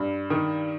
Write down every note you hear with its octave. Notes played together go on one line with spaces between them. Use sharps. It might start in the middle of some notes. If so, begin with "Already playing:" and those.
Already playing: G2
D#3